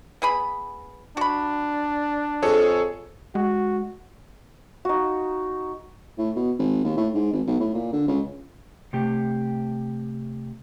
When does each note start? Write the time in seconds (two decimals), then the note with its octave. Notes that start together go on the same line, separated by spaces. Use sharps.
0.22 B3 G#4 B5
1.17 D4 F#4 B5
2.42 F2 G#4 A4 C#5
3.35 G#3 F#4
4.85 D#4 F#4
6.18 A2
6.36 B2
6.59 G#1
6.84 D#2
6.97 A2
7.14 G#2
7.33 G#1
7.47 B1
7.60 A2
7.74 A#2
7.93 D3
8.08 C#2
8.93 C3 A3 G4